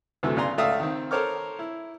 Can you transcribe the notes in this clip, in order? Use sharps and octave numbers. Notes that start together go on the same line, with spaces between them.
D2 C3 E3 F#3 A3 A4
B1 C#3 D5 G#5 A#5 C6
C#2 A3 D5 E5 F5 D#6
D#3 C4
A4 A#4 C5 C#5 D6 F6
E4